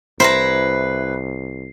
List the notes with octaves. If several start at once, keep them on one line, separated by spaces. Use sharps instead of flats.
C2 E4 B4 C5 A#5 C7